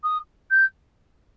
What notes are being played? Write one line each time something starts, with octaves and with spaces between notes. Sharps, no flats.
D#6
G6